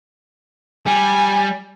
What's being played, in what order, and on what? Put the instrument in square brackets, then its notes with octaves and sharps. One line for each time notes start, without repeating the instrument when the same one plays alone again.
[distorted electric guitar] G3 [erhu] G#5